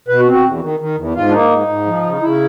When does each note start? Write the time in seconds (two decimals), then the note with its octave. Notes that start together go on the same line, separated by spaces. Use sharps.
0.08 B2 B4
0.20 F#4
0.26 C4
0.32 F#4
0.44 E2
0.61 D#3
0.80 D#3
0.97 E2
1.14 G#2 F4
1.29 D4
1.32 A#3 D#4
1.50 G#2
1.68 G#2
1.86 F3
2.03 C#3
2.21 C#3 E4